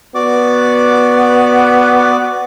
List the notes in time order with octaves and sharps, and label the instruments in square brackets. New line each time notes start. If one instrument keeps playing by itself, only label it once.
[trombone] B3 [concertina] F#4 D5 D6